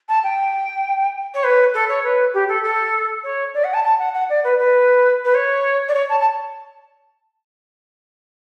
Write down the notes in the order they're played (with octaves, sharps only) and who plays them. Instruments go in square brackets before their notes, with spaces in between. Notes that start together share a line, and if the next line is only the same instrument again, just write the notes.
[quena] A5
G5
C#5
B4
A4
C#5
B4
G4
A4
A4
C#5
D5
F#5
A5
A5
F#5
F#5
D5
B4
B4
B4
C#5
D5
C#5
A5
A5